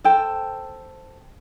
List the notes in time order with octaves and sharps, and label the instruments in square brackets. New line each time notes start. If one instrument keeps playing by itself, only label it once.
[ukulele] A4 C5 G5 A5